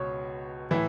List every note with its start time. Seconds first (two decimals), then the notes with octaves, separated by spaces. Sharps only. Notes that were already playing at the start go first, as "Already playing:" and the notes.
Already playing: C#2 B2 C#5
0.71 A2 E3 E4